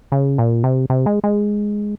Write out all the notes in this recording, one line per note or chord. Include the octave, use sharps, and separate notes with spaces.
C#3
A#2
C3
C3
G#3
G#3